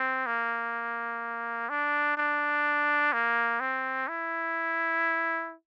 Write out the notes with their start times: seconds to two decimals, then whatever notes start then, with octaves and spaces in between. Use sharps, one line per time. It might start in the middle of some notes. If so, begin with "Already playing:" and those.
Already playing: C4
0.26 A#3
1.69 D4
2.17 D4
3.13 A#3
3.60 C4
4.08 E4